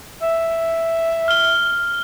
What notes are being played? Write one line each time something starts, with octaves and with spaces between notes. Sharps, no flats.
E5
F6 G7